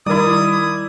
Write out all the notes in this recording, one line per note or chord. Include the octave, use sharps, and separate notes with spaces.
D#3 G3 E4 A#4 D5 D#6